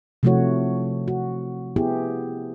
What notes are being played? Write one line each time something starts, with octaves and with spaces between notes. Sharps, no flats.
C3 F3 A3 E4 F#4 C#5
F#4
B3 E4 G4 G#4